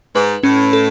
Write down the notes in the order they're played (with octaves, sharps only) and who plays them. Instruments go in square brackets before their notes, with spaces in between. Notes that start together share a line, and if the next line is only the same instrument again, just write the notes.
[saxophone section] G#2 [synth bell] B4
[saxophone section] A2 [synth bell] C#4
[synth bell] A4